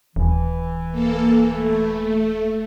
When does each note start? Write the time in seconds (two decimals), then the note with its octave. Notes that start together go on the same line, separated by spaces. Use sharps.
0.16 D#1 E3
0.92 A#3 A4
1.51 A3